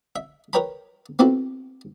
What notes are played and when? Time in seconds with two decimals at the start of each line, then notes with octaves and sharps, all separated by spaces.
0.16 E5
0.53 A#4 B4 C#5 G5 A#5 B5
1.19 B3 C4 E4 F#4 A4